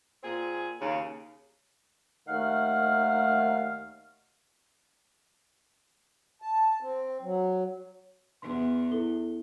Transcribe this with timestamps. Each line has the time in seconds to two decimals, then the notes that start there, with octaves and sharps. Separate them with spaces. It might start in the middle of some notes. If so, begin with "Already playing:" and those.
0.24 A#2 C4 G#4
0.81 D#2 C#3
2.27 D#2 D#3 A3 F5 F#5 F6
6.42 A5
6.81 C4
7.22 F#3
8.42 E2 C6
8.92 E4 A4 G7